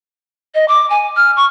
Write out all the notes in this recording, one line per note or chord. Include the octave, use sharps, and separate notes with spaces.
D#5
D6
G#5
F6
C#6